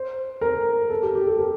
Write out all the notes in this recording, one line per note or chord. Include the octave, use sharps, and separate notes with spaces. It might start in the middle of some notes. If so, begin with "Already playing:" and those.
Already playing: C5
A#4
A4
G4
G4
A4
A#4